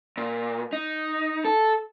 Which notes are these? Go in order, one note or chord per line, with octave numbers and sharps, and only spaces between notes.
A#2
D#4
A4